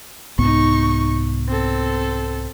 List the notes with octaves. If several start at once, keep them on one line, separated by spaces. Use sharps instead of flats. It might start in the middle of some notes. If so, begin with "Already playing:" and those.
C2 G#2 B3 D#4 C#6
C4 A4